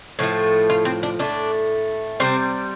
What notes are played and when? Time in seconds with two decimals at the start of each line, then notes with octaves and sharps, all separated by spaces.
0.19 A2 F3 A3
0.70 F4
0.85 C4
1.03 D4
1.19 A2 A3 D4
2.20 C3 G3 C4